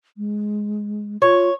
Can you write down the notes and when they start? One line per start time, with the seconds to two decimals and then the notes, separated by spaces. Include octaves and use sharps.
0.18 G#3
1.22 F4 C#5